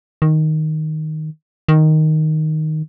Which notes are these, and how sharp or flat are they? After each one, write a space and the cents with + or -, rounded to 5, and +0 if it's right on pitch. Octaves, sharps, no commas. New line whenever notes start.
D#3 +0
D#3 +0